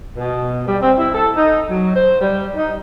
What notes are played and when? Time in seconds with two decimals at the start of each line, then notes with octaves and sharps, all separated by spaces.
0.16 B2
0.67 G3
0.81 C4
0.97 E4
1.14 A4
1.36 D#4
1.69 F#3
1.94 C5
2.21 G3
2.55 D#4